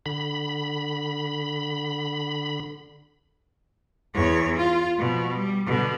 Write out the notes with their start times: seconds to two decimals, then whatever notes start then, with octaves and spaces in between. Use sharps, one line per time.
0.06 D3 B5
4.15 E2 C#5
4.56 F4
4.99 B2 F3
5.35 G3
5.67 B2 D3